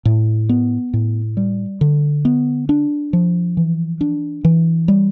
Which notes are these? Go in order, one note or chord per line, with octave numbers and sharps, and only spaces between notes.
A2
B3
A2
G3
D3
B3
D4
F3
E3
D4
E3
G3